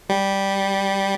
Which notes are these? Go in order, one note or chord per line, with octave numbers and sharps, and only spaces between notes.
G3